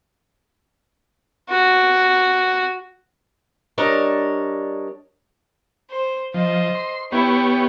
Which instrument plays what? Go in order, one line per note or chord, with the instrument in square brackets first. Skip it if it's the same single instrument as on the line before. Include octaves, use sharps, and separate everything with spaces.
[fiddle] F#4
[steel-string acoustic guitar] G3 D4 A#4 C#5 D#5
[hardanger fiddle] C5
[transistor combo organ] F3 [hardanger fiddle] C5 D#5
[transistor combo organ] C6
[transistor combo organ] B3 G4 C#5 [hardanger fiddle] E4